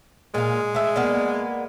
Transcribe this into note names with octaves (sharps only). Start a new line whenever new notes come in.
A#2 G#3 F4
A3 E5
A#3 B3 D5